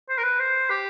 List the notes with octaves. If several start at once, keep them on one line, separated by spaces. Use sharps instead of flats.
C5
A#4
B4
C5
G4